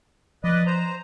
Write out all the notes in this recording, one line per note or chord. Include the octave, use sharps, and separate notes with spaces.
F3 B4 D5 D#5
C5 A#5